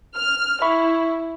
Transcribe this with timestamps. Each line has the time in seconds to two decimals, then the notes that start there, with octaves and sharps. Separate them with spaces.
0.16 F6
0.62 E4 E5 B5 C#6